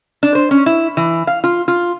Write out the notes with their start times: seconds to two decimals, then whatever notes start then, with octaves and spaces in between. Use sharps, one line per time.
0.23 D4
0.35 C5
0.51 C#4
0.66 E4
0.97 E3
1.27 F5
1.44 F4
1.68 F4